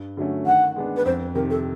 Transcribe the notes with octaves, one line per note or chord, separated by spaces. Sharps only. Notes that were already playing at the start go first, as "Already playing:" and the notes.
Already playing: G2
D3 F#3 A3 C#4
D#3 F#5
G#3 B3 D4
B4
F2 C5
C3 D#3 A#4
A4